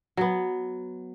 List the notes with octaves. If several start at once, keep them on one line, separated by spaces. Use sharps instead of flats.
F#3 B3